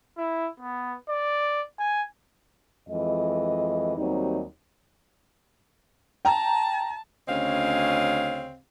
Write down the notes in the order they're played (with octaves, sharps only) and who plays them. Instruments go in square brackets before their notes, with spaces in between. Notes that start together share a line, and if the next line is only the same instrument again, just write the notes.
[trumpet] E4
B3
D5
G#5
[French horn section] F2 E3 G#3 D#5
D#2 F#3 G3 C4 D#4
[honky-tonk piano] G5 A#5 [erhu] A5
[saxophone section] D2 C#3 C4 C#4 D#5 F5